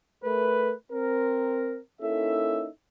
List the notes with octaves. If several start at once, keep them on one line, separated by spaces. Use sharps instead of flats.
A3 A#4 B4
C4 A#4
A#3 C#4 D#4 E4 A4 E5